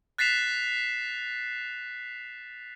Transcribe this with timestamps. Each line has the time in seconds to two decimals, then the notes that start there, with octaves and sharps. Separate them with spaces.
0.18 F#6 A6 B6 C7 E7 F7